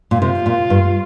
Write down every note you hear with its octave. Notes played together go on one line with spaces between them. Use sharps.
A#2
C3 F4
A#2
G2